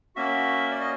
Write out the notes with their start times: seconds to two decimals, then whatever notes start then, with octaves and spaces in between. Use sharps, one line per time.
0.16 A#3 C#4 F#4 E5
0.71 D5
0.81 D#5